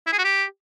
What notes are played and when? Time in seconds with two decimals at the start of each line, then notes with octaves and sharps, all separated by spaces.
0.07 E4
0.13 G#4
0.18 F#4
0.24 G4